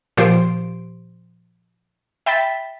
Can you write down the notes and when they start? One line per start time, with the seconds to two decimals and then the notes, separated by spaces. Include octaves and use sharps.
0.17 A#2 F3 G4 C5 C6 D7
2.26 E5 G5 B5 A6 B6